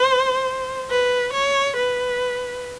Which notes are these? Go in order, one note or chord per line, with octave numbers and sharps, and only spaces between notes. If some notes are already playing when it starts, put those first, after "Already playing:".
Already playing: C5
B4
C#5
B4